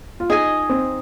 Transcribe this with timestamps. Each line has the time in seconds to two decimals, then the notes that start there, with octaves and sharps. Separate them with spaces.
0.20 F4
0.30 D#4 G#4 D#5 G#5
0.70 C4